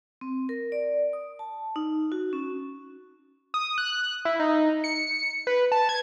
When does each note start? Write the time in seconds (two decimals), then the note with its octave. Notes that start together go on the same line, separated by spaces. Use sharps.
0.21 C4
0.49 A#4
0.72 D5
1.13 D#6
1.39 A5
1.76 D#4
2.12 F#4
2.33 C#4
3.54 D#6
3.78 F#6
4.25 E4
4.39 D#4
4.84 C#7
5.47 B4
5.72 A5
5.89 G#6